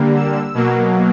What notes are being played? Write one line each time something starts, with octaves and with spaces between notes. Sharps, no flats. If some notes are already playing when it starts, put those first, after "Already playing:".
Already playing: D3 G3 A#3
E6
B2 F#3 A#3